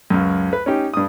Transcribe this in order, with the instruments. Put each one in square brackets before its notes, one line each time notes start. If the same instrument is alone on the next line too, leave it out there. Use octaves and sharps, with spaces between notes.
[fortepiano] C#2 F#2
B4
C#4 D#4 G4
G2 D#6